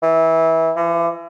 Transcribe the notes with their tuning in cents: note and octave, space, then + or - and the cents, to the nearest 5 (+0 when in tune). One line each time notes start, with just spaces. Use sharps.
E3 -20
E3 +40